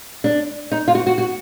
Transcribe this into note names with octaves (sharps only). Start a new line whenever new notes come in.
D4
D#4
F4
F#4
F#4
F#4